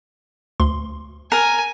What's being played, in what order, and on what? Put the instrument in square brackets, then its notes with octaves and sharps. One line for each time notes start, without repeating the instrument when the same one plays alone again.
[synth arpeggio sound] D2 C6
[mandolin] A#4 [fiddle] G#5